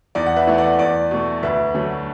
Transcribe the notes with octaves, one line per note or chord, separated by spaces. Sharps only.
E2 D5
F#5
B4 E5
E3 A3
D5 F#5
E2 D5
B2 A3
D2 B4 E5
D3 F#3 A3